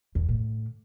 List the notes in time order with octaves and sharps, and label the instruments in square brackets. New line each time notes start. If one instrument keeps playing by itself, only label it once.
[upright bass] E2
A2 D3